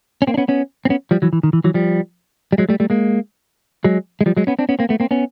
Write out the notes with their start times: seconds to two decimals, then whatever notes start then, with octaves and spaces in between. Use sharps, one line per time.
0.22 C#4
0.27 A#3 C4
0.34 D4
0.38 B3 C#4
0.48 B3 C#4
0.85 C4
0.90 B3 C#4
1.11 F3 G3
1.22 E3 F#3
1.33 E3
1.43 D#3
1.53 E3
1.64 E3 F#3
1.74 F3 G3
2.53 G3
2.58 F#3 G#3
2.69 G3 A3
2.80 G3 A3
2.90 G#3 A#3
3.84 F#3 G#3
4.21 G#3
4.26 F3 G3
4.37 F#3 G#3
4.47 B3 C#4
4.59 C4 D4
4.69 B3 C#4
4.79 A#3 C4
4.89 A3 B3
5.00 A#3 C4
5.11 B3 C#4